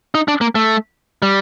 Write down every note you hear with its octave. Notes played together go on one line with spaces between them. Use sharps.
D#4
D4
A#3
A3
G3